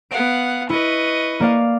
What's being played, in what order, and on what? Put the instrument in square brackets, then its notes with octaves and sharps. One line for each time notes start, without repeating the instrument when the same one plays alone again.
[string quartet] B3 F5 F#5 [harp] D7
[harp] E4 [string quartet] B4 D#5 C#6
[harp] A#3 D5 F5